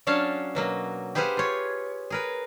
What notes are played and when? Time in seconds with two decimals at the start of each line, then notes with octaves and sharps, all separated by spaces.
0.07 F#3 C#4 D4 C#5 F5 A5
0.55 B2 F#3 A#3
1.15 G4 G#4 B4 C5 F5 F#5
1.37 F4 C#5
2.10 G#4 A#4 B4